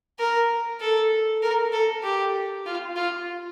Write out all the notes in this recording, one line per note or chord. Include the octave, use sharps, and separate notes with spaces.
A#4
A4
A#4
A4
G4
F4
F4